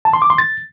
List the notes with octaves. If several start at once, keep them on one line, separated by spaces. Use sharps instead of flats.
A5
C6
D6
C6
A6